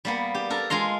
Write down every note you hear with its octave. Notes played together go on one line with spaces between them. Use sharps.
G3 A#3 B3
G4
A4 A#4
G#3 F4 A#5 C6